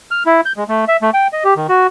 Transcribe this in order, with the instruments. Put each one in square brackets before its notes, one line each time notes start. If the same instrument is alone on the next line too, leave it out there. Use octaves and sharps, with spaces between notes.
[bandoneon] F6
E4
G6
G#3
A3
E5
A3
G5
D#5
G4
D#3
F#4